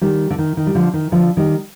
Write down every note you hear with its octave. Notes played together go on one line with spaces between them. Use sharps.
D#3 G3
D3
D#3
D#3
G3
D3 F3
D#3
D3 F3
D#3 G3